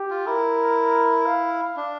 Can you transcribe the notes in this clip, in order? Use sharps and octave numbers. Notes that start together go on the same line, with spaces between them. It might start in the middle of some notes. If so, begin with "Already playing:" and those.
Already playing: G4
F4
E4 A#4
F5
D4